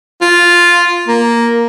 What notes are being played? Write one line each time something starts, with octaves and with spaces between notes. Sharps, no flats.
F4
A#3